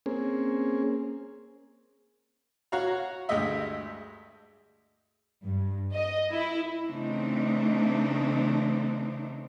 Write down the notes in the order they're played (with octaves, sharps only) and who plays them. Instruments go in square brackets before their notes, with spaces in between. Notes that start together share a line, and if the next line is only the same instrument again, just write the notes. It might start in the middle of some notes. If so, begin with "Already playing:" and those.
[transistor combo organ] A#3 C4 C#4 G#4
[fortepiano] F#4 C#5 F5 A#5
D2 G2 G#3 G4 D#5 E5
[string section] G2
D#5
E4
[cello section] C#3 E3 A3 C4 D4 D#4